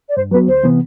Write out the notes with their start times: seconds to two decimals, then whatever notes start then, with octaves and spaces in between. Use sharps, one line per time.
0.10 D5
0.16 G2 C5
0.31 F#3 B4
0.34 B3 F#4
0.47 D2 C5
0.63 C3 E3 B3